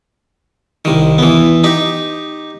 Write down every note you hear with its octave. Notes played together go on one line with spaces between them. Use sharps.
C2 D#3
E3 B3
D#4 G4